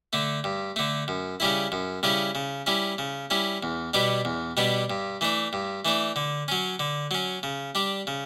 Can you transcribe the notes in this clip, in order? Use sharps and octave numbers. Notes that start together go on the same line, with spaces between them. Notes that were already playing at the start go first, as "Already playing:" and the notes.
D3 A3
G2
D3 A3
F#2
C#3 G3 C#4 E4
F#2
C#3 G3 C#4 E4
C#3
G3 C#4 E4
C#3
G3 C#4 E4
E2
B2 G3 B3 D4
E2
B2 G3 B3 D4
G2
E3 A3 D4
G2
E3 A3 D4
D3
F#3 C#4
D3
F#3 C#4
C#3
G3 D4
C#3